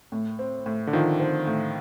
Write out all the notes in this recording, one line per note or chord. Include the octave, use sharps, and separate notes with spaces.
A2
C4
A2
D3
D#3 F3
C4
A2